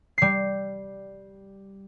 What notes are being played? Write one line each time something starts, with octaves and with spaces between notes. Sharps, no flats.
G3 C7